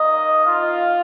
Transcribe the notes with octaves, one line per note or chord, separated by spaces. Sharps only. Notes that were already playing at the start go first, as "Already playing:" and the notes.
Already playing: A#3 D#4 D#5
F4 F5